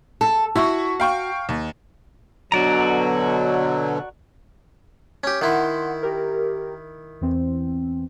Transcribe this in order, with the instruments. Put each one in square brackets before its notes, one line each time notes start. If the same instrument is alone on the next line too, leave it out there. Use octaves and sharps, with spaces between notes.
[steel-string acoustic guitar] A4
[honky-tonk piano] E4 E5 C#6 [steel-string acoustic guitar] F#4
[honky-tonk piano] F5 G5 C#6
D#2
[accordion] B2 D3 F#3 [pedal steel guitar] F#4 D5 A#5
[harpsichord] C#4 G4
[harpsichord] D#3 E4 [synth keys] F#5 C6
[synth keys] G4 A#4
E2 E3 C4